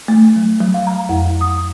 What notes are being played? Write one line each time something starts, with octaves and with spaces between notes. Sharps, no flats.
A3
F#3
F#3
F5
A#5
F2
D#6